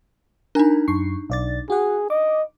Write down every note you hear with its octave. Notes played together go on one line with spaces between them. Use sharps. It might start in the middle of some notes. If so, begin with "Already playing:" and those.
D4 D#4 A#4 G#5
F#2 C#6 C7
B1 D5 A6
F#4 G#4 F#5
D#5 D6